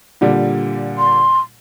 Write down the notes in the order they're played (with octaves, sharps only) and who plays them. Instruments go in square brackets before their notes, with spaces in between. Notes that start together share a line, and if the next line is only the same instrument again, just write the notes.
[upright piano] A#2 D3 G3
[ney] C6